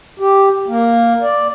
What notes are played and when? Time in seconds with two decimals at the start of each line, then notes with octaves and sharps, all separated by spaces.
0.20 G4
0.68 A#3
1.22 D5